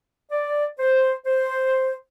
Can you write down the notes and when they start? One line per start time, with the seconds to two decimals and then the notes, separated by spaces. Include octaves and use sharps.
0.31 D5
0.79 C5
1.26 C5